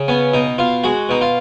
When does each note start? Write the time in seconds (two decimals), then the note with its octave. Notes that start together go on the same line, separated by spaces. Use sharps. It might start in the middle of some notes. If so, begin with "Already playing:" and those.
Already playing: C#3
0.08 B3 C#4
0.34 B2 D#4
0.58 B2 F4
0.84 G#3 F#4
1.09 B2 D#4
1.21 F4